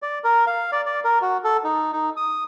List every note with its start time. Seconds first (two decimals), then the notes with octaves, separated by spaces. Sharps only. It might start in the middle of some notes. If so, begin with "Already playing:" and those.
0.02 D5
0.24 A#4
0.47 F5
0.72 D5
0.86 D5
1.04 A#4
1.22 F#4
1.44 A4
1.64 D#4
1.93 D#4
2.17 D#6